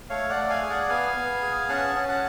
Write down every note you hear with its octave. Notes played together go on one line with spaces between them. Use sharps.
A3 C#5 F5
D5 F#5
A3
F5 G#5
G#4
D5 F#5
B3 F5 G#5
B3
G#4
C#4 F#5 A5
C#4
F#5 A5